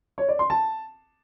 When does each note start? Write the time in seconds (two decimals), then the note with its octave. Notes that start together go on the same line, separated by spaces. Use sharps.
0.18 C#5
0.29 D5
0.39 C6
0.50 A5